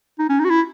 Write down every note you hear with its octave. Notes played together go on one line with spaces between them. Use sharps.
D#4
C#4
D#4
F#4
E4